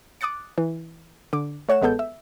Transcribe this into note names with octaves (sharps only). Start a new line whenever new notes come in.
D6 D#6 F#6 A6 C#7
E3
D3 D6
A3 C#5 F#5 E7
A1 G#3 B3 A4 G6
E5